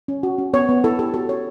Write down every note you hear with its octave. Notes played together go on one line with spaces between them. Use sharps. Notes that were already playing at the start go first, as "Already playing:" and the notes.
C#4
F#4
C#4
B3 C#5
B3
E4 A4
G4 A4
F#4 A4
C#4 C#5